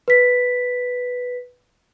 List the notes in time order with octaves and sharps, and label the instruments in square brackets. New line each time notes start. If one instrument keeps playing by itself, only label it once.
[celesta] B4 B6